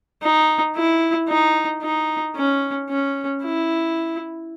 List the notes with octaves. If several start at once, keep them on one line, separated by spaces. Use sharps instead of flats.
D#4
E4
D#4
D#4
C#4
C#4
E4